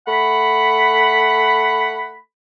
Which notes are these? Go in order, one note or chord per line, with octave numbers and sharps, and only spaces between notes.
A3 F#5 B5